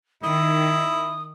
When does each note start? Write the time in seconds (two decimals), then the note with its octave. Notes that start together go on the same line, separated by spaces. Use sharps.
0.23 D#3 E4 D#6